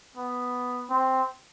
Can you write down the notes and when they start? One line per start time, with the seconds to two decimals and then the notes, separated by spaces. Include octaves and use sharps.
0.17 B3
0.90 C4